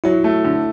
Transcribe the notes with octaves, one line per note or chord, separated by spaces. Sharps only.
F#3 E4
A3
D3